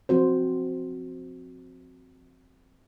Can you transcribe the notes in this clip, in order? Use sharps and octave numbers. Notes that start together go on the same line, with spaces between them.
F3 C4 F#4 C5